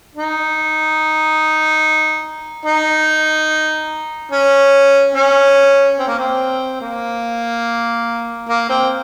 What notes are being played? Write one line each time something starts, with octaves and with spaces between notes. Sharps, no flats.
D#4
D#4
C#4
C#4
C4
A#3
C4
A#3
A#3
C4